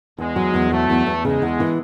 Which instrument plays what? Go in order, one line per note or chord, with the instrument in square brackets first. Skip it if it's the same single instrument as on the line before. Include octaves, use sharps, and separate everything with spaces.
[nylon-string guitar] E2 [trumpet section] G#3
[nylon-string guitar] F#3
E2
[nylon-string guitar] F#3 [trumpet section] A3
[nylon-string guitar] E2
E2
[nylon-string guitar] C#3 [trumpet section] G#3
[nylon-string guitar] E2
E3